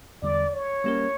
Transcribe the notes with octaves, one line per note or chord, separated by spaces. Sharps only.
E2 D3 G3 D5
C#5
G3 A#3 C#4 G4 A#4